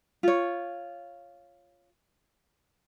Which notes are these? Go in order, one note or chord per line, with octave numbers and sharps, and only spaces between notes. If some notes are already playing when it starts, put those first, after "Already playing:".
F4 C#5